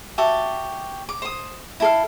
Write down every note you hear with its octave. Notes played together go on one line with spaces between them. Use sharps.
F#4 G4 E5 A5
D6
C5 D#6
E4 A4 F5